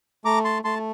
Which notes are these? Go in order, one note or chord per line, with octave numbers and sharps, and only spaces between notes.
A3 A#5 D6
A5 C6
A3 A5 C6